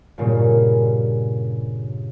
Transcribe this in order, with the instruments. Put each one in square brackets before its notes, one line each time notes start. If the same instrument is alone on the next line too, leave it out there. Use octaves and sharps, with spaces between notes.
[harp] G2 A#2 C#3 G3 A#3